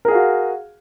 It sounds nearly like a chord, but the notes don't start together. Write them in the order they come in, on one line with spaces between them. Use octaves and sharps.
A#4 G#4 F5 F#4